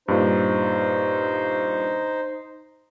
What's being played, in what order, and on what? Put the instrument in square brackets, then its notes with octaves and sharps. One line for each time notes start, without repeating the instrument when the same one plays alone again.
[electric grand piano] G2 A#2 [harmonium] D#4 C5